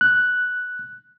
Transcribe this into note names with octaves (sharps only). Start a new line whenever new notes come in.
F#6